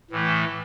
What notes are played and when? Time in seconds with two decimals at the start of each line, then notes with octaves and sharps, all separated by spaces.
0.11 A2 E3 A3